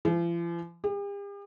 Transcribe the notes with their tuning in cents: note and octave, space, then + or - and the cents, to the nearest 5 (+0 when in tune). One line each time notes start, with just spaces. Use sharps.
F3 -45
G4 +45